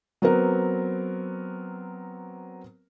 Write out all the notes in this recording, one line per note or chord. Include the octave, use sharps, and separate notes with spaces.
F#3 B3 C4 A#4